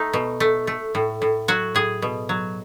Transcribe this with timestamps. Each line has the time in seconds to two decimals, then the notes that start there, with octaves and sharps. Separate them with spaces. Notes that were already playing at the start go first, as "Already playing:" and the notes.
Already playing: A3 D#4
0.13 B2
0.40 A3
0.67 A3
0.95 A2
1.22 A2
1.48 F#3 F#4
1.75 A2 G#4
2.02 B2
2.29 F#3